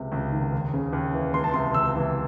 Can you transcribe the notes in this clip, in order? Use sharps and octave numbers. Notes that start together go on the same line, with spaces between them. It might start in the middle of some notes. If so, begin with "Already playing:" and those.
Already playing: C#2 C3
C#2
D#3
D#2
C#3
D#2
E3
C#2 C6
A5
C3 C6
C#2 E6
E3